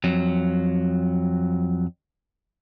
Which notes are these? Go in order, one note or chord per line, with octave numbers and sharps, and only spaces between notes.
F2 F#3